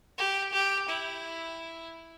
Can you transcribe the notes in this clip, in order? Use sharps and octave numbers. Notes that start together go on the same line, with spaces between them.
G4
G4
E4